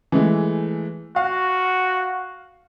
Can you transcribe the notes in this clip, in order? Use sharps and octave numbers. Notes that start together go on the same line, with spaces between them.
E3 G#3 A3
F#4 F5